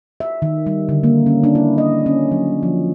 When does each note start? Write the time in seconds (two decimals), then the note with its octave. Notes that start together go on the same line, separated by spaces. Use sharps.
0.20 E5
0.42 D#3
0.66 G3
0.89 D3
1.03 A#3
1.26 C#4
1.44 D4
1.55 E4
1.78 D#5
2.06 C#4
2.32 F#3
2.63 F3